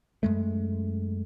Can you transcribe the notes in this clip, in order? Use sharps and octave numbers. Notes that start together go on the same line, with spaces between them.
F#2 G#3 A3